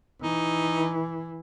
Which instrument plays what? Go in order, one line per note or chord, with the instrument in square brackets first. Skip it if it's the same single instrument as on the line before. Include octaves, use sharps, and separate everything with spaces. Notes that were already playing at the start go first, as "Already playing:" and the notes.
[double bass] E3 [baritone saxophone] D#4